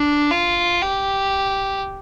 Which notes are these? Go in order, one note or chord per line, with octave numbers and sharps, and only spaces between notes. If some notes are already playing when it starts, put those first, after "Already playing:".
Already playing: D4
F4
G4